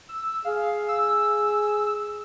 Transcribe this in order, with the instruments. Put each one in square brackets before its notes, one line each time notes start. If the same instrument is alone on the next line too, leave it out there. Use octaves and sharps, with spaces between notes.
[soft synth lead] E6
[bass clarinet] G#4 [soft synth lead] F5
[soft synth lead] E6